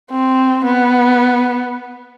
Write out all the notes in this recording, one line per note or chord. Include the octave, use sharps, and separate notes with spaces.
C4
B3